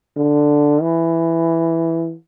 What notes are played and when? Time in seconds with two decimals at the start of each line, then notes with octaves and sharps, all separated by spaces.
0.16 D3
0.81 E3